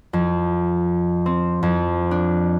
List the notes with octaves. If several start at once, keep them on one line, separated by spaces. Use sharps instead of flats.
F2
C4
F2
D4